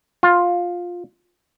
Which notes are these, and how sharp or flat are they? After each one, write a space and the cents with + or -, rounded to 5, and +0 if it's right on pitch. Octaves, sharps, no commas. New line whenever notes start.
F4 +10